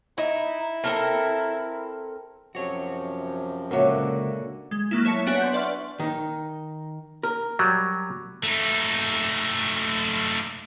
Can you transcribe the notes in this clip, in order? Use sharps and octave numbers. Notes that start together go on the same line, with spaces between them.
D#4 E4
C4 A4 A#4
F#2 C3 F3 F#4 C#5
C#2 A#2 D3 A#3 F#4 C#5 E5
G#3
F#3 A#3 E4
E4 C#5 E5 A5 C#7
B3 D4 F#4 C#5 F#5 G#5
C6 G6
B4 D5 E5 C6 C#6 F6
D#3 D#4
A#4
F#3 G3
A3 D#4